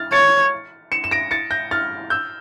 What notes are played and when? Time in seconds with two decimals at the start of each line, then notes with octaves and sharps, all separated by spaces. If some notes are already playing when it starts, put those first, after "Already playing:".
Already playing: F6 A6
0.12 C#5 A6 C#7
0.92 C#7 E7
1.04 E7
1.11 A#6 D7
1.31 A6 C#7
1.51 G6 A#6
1.71 F6 A6
2.10 E6 G6